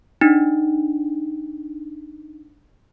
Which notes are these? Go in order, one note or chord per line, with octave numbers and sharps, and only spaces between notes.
D4 D#4